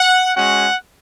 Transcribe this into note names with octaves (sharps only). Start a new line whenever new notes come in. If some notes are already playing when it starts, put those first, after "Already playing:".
Already playing: F#5
G#3 C#4 F#4 F#5